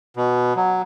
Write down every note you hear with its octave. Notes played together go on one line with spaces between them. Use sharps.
B2
F#3